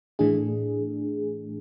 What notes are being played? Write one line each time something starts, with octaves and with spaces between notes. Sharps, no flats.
A2 E3 A3 D4 G#4